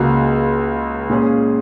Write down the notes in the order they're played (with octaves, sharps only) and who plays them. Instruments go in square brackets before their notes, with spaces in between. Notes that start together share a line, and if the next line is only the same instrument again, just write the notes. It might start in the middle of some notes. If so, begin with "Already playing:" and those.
Already playing: [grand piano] C#2 C#3 A#3 F#4
A#2 G#3 C#4 G#4